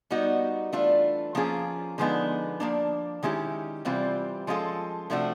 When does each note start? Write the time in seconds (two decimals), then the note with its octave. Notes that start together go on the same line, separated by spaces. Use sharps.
0.10 G3 B3 D#4 F#4
0.72 E3 A3 D4 F4
1.35 F3 A#3 C#4 F4 G#4
1.98 D3 F3 G#3 B3 D#4
2.60 F3 A#3 D4
3.23 D#3 G#3 C#4 E4 G4
3.85 C3 E3 G3 C4 F4
4.47 F3 G#3 C#4 F4 A4
5.10 C3 F3 A3 D4 F#4